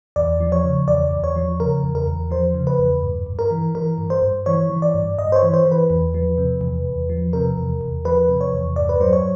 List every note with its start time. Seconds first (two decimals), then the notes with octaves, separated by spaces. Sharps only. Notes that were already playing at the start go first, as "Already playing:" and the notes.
0.16 E2 D5
0.40 F3
0.52 C#5
0.64 C#3
0.88 E2 D5
1.11 E2
1.24 C#5
1.36 F3
1.60 C#3 A#4
1.83 E2
1.95 A#4
2.07 E2
2.31 F3 C5
2.55 C#3
2.67 B4
2.78 E2
3.03 G2
3.26 G2
3.39 A#4
3.51 E3
3.75 E3 A#4
3.98 G2
4.10 C5
4.22 G2
4.46 E3 C#5
4.70 E3
4.82 D5
4.94 G2
5.18 G2 D#5
5.32 C5
5.36 C#5
5.43 E3
5.54 C5
5.65 E3
5.72 B4
5.90 E2
6.14 F3
6.38 C3
6.61 E2
6.85 E2
7.09 F3
7.33 C3 A#4
7.58 E2
7.81 E2
8.05 F3 B4
8.29 C3
8.41 C#5
8.53 E2
8.76 G2 D5
8.89 B4
9.01 F#3 C5
9.13 C#5